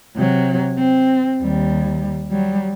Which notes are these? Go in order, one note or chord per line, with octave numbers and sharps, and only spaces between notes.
C3 F#3
C4
D#2 G3
F#3 G3